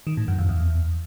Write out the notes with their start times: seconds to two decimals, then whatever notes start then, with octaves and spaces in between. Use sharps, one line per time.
0.07 D#3
0.17 A2
0.28 F#2
0.38 F2
0.49 E2